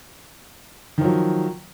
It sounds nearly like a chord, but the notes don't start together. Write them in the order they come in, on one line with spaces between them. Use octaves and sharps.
D#3 F3 F#3